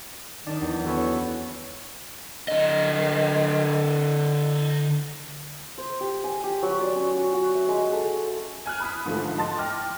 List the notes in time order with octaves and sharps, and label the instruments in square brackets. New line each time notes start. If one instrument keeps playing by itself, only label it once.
[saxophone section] D#3 [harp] D4
[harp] E2
[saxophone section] B3 A4 [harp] C#4 F#4
[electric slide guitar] D3 D#5
[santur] C5
G4
G#5
G4
F#3
D5
C#4
F#4
F#4
E5
G#3
A4
[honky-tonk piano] G#5 F6 F#6
B5 D#6 B6
G#2 D3 F3 A3
D#5 A5 C6 A6
G5 D6 F6 A#6